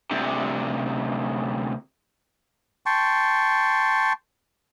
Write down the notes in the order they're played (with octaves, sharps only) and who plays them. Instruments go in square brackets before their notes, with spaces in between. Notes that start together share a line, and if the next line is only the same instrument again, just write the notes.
[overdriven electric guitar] D2 C3
[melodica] G5 A5 C6 C#6